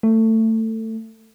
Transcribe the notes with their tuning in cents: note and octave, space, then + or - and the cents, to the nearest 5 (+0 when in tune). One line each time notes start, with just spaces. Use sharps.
A3 +20